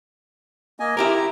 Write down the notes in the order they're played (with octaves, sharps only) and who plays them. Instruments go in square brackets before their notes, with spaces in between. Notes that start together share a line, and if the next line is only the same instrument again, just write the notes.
[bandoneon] A#3 D#5 G#5
[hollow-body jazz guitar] E4 G4 A#4 [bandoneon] A#5